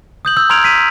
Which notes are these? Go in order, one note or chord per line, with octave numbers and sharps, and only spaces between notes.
D#6 G6 F#7
E6 G6
A#5 C6 F6 G#6 D7 F7
B6 D#7